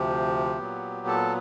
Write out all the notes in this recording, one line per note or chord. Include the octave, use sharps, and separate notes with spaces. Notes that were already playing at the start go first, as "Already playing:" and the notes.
Already playing: D2 C3 F3 G4
A#2 F#3 B3
A4